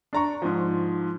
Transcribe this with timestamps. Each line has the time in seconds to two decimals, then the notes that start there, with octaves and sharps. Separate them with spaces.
0.13 D4 A#5 C#6
0.42 G#2 F3